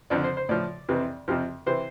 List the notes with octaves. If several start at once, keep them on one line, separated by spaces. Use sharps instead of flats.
F2 D3 F3 D5
C5
C5
A2 F3 D5
F2 C3 E3
F2 C3 F3
C3 E3 C5